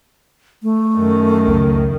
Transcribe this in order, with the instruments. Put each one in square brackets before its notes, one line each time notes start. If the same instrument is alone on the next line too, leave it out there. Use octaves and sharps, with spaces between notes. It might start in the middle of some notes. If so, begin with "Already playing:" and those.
[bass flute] A3
[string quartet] F#2 D#3
[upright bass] C#2